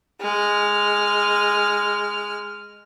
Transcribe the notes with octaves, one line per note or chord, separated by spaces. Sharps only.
G#3 F6